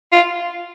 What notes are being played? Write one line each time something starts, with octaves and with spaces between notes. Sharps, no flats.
F4